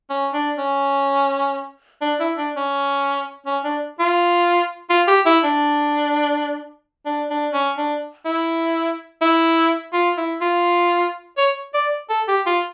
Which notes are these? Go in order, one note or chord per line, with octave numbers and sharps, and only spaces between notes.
C#4
D4
C#4
D4
E4
D4
C#4
C#4
D4
F4
F4
G4
E4
D4
D4
D4
C#4
D4
E4
E4
F4
E4
F4
C#5
D5
A4
G4
F4